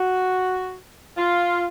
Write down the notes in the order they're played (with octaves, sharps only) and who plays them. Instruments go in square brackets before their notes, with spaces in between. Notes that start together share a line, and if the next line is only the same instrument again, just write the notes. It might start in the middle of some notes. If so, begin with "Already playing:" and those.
Already playing: [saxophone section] F#4
F4